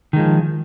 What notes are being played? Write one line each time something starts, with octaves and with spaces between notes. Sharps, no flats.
D#3 F3 G#3